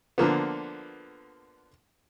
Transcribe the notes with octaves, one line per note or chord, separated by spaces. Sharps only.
D3 F3 A#3 B3